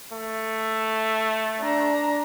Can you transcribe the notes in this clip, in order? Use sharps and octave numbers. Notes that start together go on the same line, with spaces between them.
A3
D4 A#5